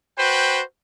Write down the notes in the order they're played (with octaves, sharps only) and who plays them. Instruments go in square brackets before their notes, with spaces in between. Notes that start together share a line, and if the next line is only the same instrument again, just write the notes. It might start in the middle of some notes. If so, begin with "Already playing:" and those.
[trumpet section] F#4 B4 C5 G5